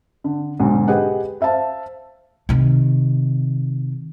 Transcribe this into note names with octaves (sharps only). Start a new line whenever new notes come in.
D3
B1 G#2 D3
G4 G#4 B4 D#5 F#5
C5 E5 F5 A5
C3 D#3